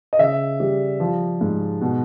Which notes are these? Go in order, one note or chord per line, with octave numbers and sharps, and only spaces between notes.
D#5
C#3 E5
G3
F3
G#2
B2